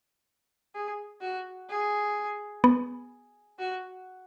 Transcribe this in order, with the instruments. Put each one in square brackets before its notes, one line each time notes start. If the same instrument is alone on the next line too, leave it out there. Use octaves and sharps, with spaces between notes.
[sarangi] G#4
F#4
G#4
[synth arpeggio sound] B3
[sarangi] F#4